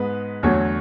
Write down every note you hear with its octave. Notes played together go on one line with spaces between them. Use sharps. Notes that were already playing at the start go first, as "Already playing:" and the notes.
Already playing: G#2 G#3 B3 B4
E2 D3 F#3 A3 C#5